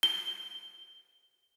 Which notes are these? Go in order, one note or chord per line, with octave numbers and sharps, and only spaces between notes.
G7